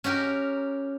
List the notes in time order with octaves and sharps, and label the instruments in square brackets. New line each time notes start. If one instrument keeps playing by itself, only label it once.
[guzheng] C#4 F#4 G4 A#4